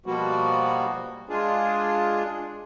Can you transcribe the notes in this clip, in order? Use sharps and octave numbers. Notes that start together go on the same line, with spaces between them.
B2 F3 G3 A#3 B3 F#4
G#3 D4 F4 G#4